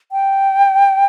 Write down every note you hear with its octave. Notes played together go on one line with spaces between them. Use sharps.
G5